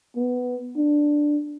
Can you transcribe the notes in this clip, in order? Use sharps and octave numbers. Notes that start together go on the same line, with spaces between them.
B3
D4